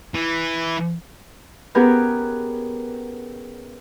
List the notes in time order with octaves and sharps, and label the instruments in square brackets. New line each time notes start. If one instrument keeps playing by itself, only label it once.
[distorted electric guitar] E3
[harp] B3 C#4 G4 G#4 A#4 B4